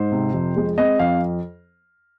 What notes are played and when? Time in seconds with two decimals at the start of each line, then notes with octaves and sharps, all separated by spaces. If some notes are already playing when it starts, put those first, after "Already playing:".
Already playing: G#2 C5
0.12 C3
0.34 F2
0.57 G#3
0.78 C4 D#5
0.99 F2 F5